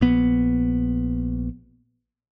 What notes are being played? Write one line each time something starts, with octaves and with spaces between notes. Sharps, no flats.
A#1 B3